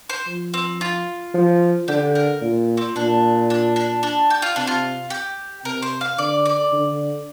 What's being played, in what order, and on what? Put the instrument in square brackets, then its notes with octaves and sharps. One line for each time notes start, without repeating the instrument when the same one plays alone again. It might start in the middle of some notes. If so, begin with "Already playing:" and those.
[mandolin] C5
[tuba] F3
[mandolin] C4
F4
[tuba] F3
[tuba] D3 [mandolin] G4
[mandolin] A#4
[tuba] A#2
[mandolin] C4
[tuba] A#2 [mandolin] D4
[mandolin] D4
D4
D4
G4
F4
[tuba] C3 [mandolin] D4
[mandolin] F4
G4
[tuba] C3 [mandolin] A#4
[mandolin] C5
F5
[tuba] D3 [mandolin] D5
[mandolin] D5
[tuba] D3